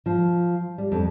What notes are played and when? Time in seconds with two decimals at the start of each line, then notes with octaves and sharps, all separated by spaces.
0.06 F3
0.78 G3
0.92 F2